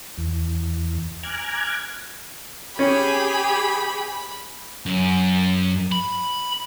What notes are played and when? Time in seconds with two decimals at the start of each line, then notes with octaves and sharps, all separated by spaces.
0.18 E2
1.23 G#5 A#5 D6 F6 F#6 G#6
2.79 C#4 G4 G#4 B5
4.86 F#2
5.92 B5